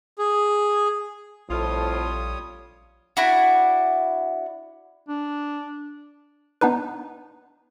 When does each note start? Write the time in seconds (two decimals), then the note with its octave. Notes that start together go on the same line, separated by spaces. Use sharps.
0.18 G#4
1.49 A#1 F2 A2 G3 F4 A4 C#5 D#6
3.17 D4 E4 F#4
5.08 D4
6.61 B3 D4 D#4 B4